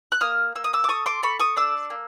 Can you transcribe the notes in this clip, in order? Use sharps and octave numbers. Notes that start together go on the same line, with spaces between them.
F#6
A#3 D#6 F6
A#3 E6
D#6
D6 E6
D6
A4 C#6 D#6
C6 D6
A4 B5 C#6
C#6 D#6
D4 D6 E6
A#3